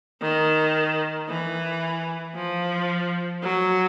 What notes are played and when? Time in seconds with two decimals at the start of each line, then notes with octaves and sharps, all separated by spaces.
0.22 D#3
1.29 E3
2.35 F3
3.43 F#3